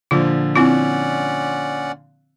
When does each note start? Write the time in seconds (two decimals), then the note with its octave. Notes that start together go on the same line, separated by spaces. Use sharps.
0.11 A#2 D3 F3 F4
0.55 C4 C#4 E4 F4 D5 F#5